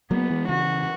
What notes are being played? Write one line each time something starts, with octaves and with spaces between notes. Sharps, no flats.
F#3 A#3 B3
E3 G#3
C#3 E3 F#4